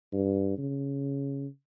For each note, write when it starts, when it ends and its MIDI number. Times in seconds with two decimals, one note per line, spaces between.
0.12 0.54 43
0.58 1.47 49